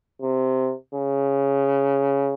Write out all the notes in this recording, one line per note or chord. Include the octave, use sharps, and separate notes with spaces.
C3
C#3